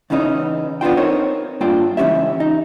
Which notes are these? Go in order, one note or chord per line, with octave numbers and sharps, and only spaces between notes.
E2 C#3 E3 C#4 D#4
B3 D4 F4 G5
C4 D#4 A#4 C5 C#5
G2 A#3 D4 F4 G5
C#2 E3 A3 C#4 G4 E5
D#4